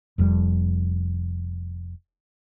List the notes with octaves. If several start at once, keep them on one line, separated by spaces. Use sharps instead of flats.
F1 F2 B2 G3